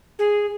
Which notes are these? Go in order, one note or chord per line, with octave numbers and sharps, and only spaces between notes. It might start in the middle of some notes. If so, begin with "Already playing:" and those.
G#4